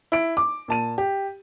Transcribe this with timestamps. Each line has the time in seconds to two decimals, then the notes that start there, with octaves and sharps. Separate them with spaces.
0.12 E4 D7
0.37 D6
0.68 A#2 A5 D#7
0.98 G4